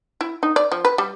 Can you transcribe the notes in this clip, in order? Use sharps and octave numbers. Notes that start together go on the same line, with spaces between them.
E4
D#4
D5
F3
B4
G3